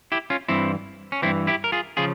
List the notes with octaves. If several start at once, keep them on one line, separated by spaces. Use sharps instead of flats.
E4 G4
C#4 F4
G2 E3 C4 E4
C#4
G2 E3 C4 E4
E4 G4
A#4
F4 G#4
C#3 F3 F4 G#4